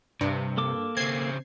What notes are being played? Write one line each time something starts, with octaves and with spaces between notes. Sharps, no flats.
G2 C3
A#3 A4 D6
C#3 C4 G#6 C7